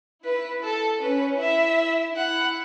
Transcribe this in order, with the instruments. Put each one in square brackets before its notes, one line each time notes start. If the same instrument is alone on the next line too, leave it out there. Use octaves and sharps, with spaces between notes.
[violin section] E4 [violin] B4
[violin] A4
[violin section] C#4 [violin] B4
[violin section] E4 [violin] E5
[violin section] E4 [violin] F#5